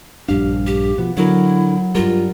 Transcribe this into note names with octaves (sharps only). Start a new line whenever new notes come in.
A#1 G2 D4 G4 F5
G4
B2 F3 B3
D3 F#3 E4 A#4
G2 G3 F4 A#4